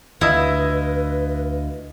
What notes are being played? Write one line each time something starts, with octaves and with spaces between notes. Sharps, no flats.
D2 D3 E4 F4 B4 D#5 E6